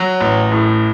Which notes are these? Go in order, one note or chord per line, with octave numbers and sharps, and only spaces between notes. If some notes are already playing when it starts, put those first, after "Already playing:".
Already playing: F#3
A1
A2